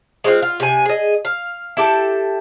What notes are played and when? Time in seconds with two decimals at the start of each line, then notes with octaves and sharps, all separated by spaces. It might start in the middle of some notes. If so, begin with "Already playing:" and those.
0.24 G#3 C4 F4
0.42 F4
0.60 C3 G#5
0.85 G#4 D#5
1.25 F5
1.77 E4 G4 A4